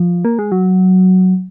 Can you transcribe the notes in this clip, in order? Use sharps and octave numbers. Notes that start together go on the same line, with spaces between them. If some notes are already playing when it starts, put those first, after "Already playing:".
Already playing: F3
A#3
G#3
F#3